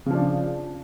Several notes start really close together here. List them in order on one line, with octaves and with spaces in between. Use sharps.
C#3 F3 D4